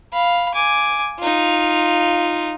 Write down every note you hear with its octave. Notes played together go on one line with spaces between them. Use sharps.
F5 B5
G#5 D6
D#4 F4